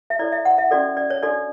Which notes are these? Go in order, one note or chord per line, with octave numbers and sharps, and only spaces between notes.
E5
E4 A4 C#5 D5
E5
F#5
E5
C#4 F#4 A4 D5
D5
C#5
D4 F#4 A4 D5